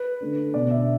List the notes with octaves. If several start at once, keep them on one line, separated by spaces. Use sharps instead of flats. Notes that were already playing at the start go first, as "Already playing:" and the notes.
Already playing: B4
D3 A3 D4
B2 B3 D4 D5
E5